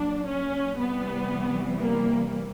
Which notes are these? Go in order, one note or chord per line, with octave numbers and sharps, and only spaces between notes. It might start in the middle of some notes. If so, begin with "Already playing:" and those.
Already playing: A#2 F#3 D4
C#4
C3 E3 G3 B3
A#3